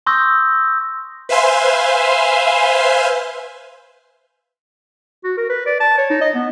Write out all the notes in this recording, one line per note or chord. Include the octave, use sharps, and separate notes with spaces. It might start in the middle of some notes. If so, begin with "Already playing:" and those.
C6 C#6 D#6 E6 G6 A#6
B4 C5 E5 F5 G#5 C6
F#4
A#4
B4
D5
A5
C#5
D#4
D#5
B3